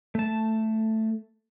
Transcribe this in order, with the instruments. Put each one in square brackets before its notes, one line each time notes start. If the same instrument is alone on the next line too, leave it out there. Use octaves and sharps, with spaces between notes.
[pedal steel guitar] A3 A5